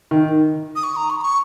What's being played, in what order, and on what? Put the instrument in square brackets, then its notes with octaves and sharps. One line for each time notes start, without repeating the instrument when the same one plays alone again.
[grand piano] D#3
[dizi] D#6
C#6
A#5
C#6
B5
C#6